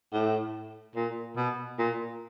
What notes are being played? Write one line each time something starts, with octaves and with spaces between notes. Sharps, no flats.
A2
A#2
B2
A#2